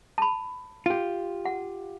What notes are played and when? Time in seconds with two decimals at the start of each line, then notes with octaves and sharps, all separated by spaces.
0.18 A5 B5
0.86 F4 G4
1.45 F#5